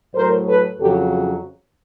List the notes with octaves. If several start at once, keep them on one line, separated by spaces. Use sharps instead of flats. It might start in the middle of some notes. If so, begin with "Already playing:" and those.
A2 F#3 A#4 C5
A4 B4
F2 C#3 F#3 G4 A4